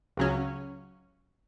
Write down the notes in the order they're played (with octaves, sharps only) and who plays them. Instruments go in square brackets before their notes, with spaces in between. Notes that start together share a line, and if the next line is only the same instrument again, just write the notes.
[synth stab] C#2 C#3 F#3 C#4